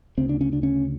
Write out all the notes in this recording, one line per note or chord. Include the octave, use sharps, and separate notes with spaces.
D2 C#3 C4
D4
C#4
D4
C#4